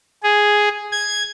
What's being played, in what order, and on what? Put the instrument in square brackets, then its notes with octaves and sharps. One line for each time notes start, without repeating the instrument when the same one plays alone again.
[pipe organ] G#4
G#6